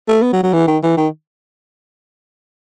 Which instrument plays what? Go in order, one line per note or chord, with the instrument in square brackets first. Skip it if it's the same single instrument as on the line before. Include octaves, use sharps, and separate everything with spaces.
[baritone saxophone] A3
B3
F#3
F#3
E3
D#3
E3
D#3